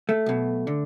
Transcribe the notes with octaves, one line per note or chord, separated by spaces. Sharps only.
A3
B1 B2
D3